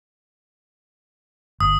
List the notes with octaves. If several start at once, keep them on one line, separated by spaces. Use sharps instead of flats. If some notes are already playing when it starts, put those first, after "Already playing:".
G1 D#6